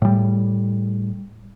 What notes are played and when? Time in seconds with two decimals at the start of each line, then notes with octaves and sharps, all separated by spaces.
0.02 A2 G3